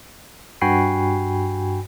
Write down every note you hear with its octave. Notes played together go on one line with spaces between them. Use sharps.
G2 F#4 G5 G#5 B5 C7